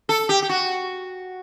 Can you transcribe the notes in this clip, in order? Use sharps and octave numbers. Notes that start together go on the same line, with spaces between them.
A4
G4
G4
F#4